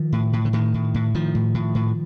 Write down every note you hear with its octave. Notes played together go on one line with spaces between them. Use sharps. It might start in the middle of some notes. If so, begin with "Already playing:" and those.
Already playing: D#3 F3
A2
A2
D3
A2 D#3
A2
A2
A2 D#3 F3
A2
A2
A2